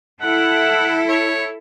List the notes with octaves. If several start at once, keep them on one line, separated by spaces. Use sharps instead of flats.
E4 A4 F#5
C#5